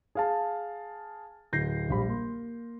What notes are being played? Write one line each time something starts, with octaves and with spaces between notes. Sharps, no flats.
G#4 F5 A5
D1 G6 A#6 C7
A#1 G3 B5
A#3 C6